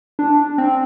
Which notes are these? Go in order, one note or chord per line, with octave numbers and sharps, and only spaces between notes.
D4
C4